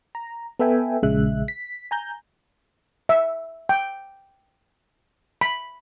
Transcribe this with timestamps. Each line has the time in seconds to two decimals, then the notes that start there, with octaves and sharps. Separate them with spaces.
0.15 A#5
0.59 B3 A4 B4 E5 G5 G#5
1.03 A#1 C#3 G#3 E5 F#6
1.48 B6
1.91 G#5 A#5 G6
3.09 E5
3.69 G5
5.41 B5